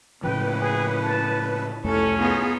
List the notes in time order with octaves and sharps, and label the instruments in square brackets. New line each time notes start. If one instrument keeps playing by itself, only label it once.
[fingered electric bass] A2 C#3 F3 [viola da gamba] A#3 C#4 E4 [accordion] B4 [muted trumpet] G5
[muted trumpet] G#4
A5
[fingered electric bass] C2 F2 A3 [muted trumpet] C#4 [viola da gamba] E4 A4
[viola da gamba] B3 D#4 F4 [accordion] G#4